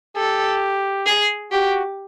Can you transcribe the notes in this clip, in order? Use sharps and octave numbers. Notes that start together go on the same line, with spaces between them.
G4 A4
G#4
F#4 G4